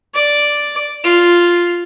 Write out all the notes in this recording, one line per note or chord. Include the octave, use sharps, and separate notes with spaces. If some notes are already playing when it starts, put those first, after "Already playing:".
D5
F4